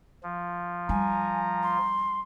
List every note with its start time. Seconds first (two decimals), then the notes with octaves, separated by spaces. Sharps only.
0.23 F3
0.89 G3 G#5 A#5
1.63 C6